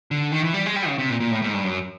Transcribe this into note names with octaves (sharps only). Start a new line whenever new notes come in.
D3
D#3
E3
G3
G#3
G3
C#3
C3
A#2
A#2
A2
G#2
G2
F#2